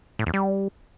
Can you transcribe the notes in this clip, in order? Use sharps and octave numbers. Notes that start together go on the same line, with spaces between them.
A2
E2
G3